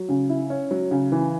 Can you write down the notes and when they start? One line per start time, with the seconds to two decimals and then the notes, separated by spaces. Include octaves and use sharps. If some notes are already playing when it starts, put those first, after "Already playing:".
Already playing: F#3
0.09 C#3
0.29 E4
0.50 C#4
0.71 F#3
0.91 C#3
1.12 E3